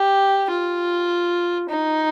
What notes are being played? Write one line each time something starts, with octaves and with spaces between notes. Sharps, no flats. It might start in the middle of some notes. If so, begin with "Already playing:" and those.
Already playing: G4
F4
D#4